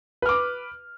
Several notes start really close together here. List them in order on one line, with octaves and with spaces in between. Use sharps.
B4 F6 D6